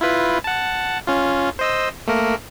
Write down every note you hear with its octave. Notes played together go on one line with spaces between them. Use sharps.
E4 F4 B4
F#5 A5
C#4 F4
C5 D#5 E6
A3 A#3 A#4